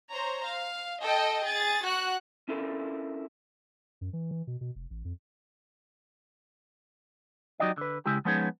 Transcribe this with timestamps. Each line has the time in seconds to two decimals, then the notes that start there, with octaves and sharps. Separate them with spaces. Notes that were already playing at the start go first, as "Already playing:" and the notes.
0.11 C5 C#5 A#5
0.45 F5
1.01 A4 D#5 G5 A5
1.44 G#4 A6
1.85 F#4 F#5 F#6
2.49 C#4 D4 E4 F4 A4 A#4
4.01 F#2
4.13 E3
4.31 E3
4.47 B2
4.61 B2
4.76 F1
4.90 A1
5.05 F2
7.60 F#3 D#4 F#4 G4 D5 D#5
7.78 D3 B4
8.06 C#3 G#3 E4 G4
8.25 F3 G#3 B3 C#4 D#4 G#4